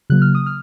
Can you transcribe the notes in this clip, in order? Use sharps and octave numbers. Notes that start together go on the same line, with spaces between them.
C#3 F#3 A#3 F#6
F6
D#6
F6